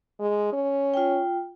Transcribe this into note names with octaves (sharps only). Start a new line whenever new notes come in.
G#3
C#4
F4 G5